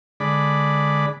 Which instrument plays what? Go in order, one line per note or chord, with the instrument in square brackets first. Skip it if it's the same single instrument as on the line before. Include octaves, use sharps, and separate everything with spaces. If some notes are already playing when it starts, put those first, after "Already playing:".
[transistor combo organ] D3 G#3 D5 B5